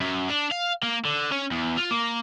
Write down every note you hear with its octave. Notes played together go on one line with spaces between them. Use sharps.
F#2
D4
F5
A#3
D3
C#4
E2
F4
A#3